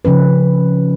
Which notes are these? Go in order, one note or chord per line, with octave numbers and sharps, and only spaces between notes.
C#3 F3 C#4 B4